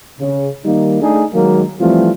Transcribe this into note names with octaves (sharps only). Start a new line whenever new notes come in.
C#3
D#3 G3 A#3 D#4
A3 D4 D#4 G#4
D#3 F#3 G#3 A#3
E3 F3 G3 A3 C4 F4